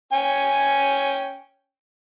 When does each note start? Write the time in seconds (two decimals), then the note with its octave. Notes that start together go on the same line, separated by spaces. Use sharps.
0.13 C#4 G5 G#5